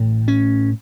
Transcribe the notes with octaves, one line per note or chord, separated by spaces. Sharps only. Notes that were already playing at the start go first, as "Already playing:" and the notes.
Already playing: A1 A2
C#4